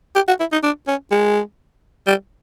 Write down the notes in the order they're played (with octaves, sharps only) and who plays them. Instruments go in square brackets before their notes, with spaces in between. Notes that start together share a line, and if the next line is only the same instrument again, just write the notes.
[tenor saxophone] G4
F#4
E4
D#4
D4
C#4
G#3
G3